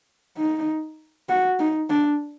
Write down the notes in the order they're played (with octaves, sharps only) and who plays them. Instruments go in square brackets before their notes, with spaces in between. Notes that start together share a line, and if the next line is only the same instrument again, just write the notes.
[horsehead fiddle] D#4
F#4
D#4
D4